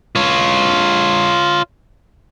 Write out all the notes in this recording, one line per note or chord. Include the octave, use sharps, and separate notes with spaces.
F4 C#5